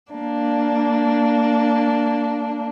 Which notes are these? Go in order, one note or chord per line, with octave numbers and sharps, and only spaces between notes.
A#3 D4